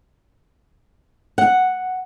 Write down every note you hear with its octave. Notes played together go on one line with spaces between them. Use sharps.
F#5